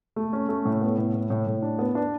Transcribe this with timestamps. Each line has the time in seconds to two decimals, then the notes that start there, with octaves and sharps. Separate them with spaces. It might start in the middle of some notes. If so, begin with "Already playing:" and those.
0.16 A3
0.33 C#4
0.49 A3
0.65 A2
0.81 B3
0.98 A2
1.14 A2
1.30 A2
1.47 A2
1.62 D4
1.79 B3
1.95 D4